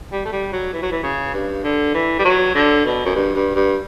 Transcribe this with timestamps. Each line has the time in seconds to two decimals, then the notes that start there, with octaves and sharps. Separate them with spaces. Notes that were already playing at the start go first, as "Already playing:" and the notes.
0.12 G3
0.25 A3
0.32 G3
0.52 F#3
0.73 E3
0.82 F#3
0.91 E3
1.03 C#3
1.34 G2
1.64 D3
1.94 E3
2.19 G3
2.25 F#3
2.55 D3
2.85 B2
3.05 F#2
3.15 G2
3.35 G2
3.55 G2